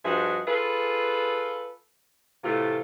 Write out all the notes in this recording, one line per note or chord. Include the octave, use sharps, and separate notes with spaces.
G2 F3 D#4 F#4 G#4 E5
F4 G#4 A4 B4
A2 C3 E3 A3 F4